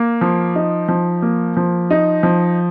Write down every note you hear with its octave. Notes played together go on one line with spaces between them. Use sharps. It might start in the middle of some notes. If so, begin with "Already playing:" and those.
Already playing: A#3
F3
D#4
F3
A#3
F3
D#4
F3